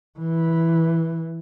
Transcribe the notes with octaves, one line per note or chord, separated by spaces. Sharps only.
E3